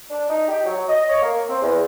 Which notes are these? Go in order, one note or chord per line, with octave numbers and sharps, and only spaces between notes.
D4
D#4
G4
F#3
D#5
C#5
A#3
C4
E2